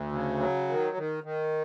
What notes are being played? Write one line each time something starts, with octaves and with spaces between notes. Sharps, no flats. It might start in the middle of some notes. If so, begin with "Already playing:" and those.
Already playing: D2
C#3
F#3
D#3
D#3
D#3